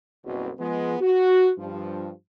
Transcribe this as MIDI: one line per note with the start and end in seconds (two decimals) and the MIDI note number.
0.24 0.50 30
0.24 0.50 36
0.24 0.50 47
0.58 0.95 53
0.58 0.95 56
0.58 0.95 59
1.00 1.49 66
1.58 2.09 43
1.58 2.09 53